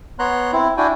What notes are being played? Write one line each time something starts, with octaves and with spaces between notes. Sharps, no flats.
B3 C#5 A#5 C6 F#6
C4 E4
D4 E4 F#4 G5 G#5